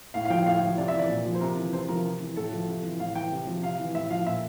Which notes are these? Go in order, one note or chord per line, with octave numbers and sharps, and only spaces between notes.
A2 F5
F5
F3 G5
A2 F5
F3
C3 D5
E5
E3
D5
A#2
F3
C5
C3 A#4
E3
C3 C5
F3 A#4
C3
E3
A2 A4
F3
C3
E3
A2 F5
E3 G5
C3
F3
C3 F5
E3
A2 E5
F3 F5
A#2 E5